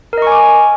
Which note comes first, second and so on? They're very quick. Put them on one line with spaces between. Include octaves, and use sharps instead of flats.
A#4 D#5 C#6 G#5 D6